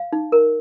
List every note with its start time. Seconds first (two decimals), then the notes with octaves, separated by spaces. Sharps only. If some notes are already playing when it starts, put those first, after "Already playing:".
Already playing: F5
0.13 D#4
0.32 A#4